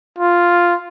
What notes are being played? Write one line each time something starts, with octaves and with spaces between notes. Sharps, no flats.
F4